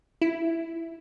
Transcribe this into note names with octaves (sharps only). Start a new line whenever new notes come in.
E4